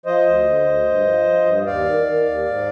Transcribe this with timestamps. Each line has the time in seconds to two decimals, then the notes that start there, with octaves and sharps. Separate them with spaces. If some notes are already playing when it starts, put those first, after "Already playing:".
0.06 F3 C5 D#5
0.25 D2
0.45 D3
0.66 D2
0.86 G2
1.05 F3
1.26 F3
1.45 G2
1.66 D#2 D5 F5
1.85 D#3
2.05 D#3
2.25 D#2
2.46 G#2